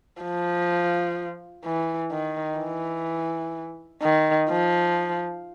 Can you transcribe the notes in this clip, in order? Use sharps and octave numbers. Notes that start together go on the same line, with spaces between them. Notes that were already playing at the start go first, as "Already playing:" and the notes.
F3
E3
D#3
E3
D#3
F3